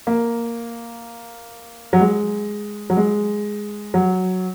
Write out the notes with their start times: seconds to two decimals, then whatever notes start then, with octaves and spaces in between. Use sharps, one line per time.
0.07 A#3
1.93 F#3
2.00 G#3
2.90 F#3
2.97 G#3
3.94 F#3